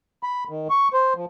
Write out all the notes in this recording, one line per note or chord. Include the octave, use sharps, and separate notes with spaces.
B5
D#3
C#6
C5
F3